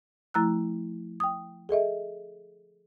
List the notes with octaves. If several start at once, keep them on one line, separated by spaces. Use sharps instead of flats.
F3 A3 E4 A#5 E6 F#6
G5 D#6
G#4 A4 D#5 E5